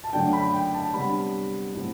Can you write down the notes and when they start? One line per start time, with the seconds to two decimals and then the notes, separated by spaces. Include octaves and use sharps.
0.04 A5
0.13 F#2 D3 F#3 A3 D4 G5
0.33 B5
0.53 G5
0.74 A5
0.94 C3 G3 B3 D4 B5
1.74 A2 F#3 C4